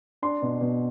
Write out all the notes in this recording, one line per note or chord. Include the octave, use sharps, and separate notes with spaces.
D4 C6
B2
B2